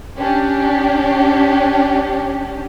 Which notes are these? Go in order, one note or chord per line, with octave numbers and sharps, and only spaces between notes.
C#4 D4 G4